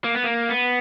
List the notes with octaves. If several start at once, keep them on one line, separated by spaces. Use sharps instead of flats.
A#3
B3
A#3
B3